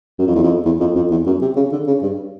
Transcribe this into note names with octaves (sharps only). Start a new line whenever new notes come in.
F#2
F2
E2
F2
E2
F2
F2
E2
F#2
C3
C#3
D3
C#3
G2